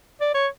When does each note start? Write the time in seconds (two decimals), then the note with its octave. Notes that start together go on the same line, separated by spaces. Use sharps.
0.21 D5
0.34 C#5